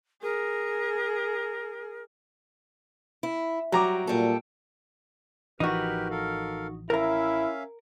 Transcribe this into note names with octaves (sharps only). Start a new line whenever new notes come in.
G#4 A#4
E4
F#3 G3 A#5 D6
A#2 G3 A4
A1 E3 F3 D#4 F#4 G4 A#4 B4
A4 A#4 F5
C#4 E4 A#4 E5 F5 A#5